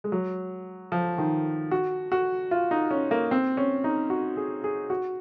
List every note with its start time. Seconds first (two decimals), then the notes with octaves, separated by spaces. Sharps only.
0.04 G#3
0.12 F#3
0.92 F3
1.18 D#3
1.71 F#4
2.12 F#4
2.51 F4
2.71 D#4
2.91 C#4
3.11 A#3
3.31 C4
3.57 C#4
3.84 D#4
4.10 F#4
4.37 G#4
4.64 G#4
4.90 F#4